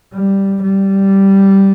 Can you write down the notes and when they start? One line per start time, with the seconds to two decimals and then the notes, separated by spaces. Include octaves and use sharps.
0.14 G3
0.63 G3